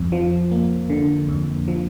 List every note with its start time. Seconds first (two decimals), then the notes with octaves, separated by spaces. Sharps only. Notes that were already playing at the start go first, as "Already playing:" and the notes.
Already playing: F2
0.12 F3
0.51 A#3
0.90 D3
1.29 F2
1.68 F3